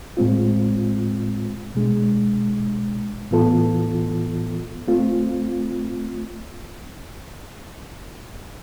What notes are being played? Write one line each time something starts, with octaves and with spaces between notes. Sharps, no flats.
A2 G#3 C4 F4
B2 G#3 D4
A2 E3 B3 F4 A4
A3 C4 F4